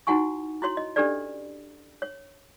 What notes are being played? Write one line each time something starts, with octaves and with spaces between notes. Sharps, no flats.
D#4 E4 F#4 F#5 G#5 C#6
E4 F#4 C#5 C6
D#5
C#4 D4 G4 A4 B4 D5
C#5